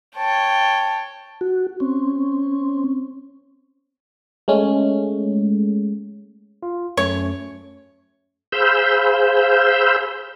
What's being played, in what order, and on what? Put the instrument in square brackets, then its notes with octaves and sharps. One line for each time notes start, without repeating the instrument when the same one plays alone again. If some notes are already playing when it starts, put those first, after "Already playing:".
[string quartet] C#5 G5 [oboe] A5
[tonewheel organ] F#4
C4 C#4
[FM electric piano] G#3 A3 C#4
[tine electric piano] F4
[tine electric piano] F#2 A3 C#4 [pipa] C#5
[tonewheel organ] G#4 C5 F5 B5 E6 G6